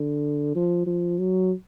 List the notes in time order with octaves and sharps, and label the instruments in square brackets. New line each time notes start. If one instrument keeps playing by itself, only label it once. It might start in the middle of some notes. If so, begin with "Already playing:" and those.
Already playing: [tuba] D3
F3
F3
F#3